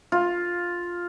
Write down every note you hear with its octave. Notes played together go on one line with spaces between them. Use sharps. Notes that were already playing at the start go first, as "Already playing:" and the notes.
F4